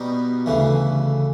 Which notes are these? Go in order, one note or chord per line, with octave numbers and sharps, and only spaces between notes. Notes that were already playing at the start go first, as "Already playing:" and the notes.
Already playing: B2 G3 B3 D#4
D2 C#3 E3